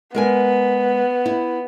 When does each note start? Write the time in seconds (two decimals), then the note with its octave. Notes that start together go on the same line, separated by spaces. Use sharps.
0.15 G#3 B3 A#4 G#5
1.26 E4